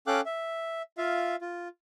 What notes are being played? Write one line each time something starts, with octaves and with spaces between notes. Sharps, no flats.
C#4 A4 F5 G5 D6 F#6
E5
F4 E5 F5
F4